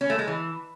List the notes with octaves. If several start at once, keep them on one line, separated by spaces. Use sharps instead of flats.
C#4
A3
G#3
E3